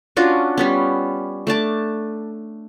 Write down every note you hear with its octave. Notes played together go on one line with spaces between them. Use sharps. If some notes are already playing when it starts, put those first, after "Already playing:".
C#4 D4 F4 F#4
G3 B3 C#4
A3 D4 A5 D6